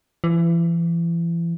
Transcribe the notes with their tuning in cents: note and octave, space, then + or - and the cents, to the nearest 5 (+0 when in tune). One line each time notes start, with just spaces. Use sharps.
E3 +35